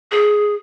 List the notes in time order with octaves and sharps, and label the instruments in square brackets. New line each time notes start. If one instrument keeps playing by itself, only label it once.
[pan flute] G#4